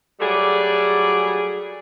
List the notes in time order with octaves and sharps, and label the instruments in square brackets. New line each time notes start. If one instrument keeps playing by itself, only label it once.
[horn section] F#3 G3 A3 G#4 D5